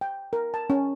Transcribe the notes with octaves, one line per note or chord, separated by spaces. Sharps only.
G5
A#4
A5
C#4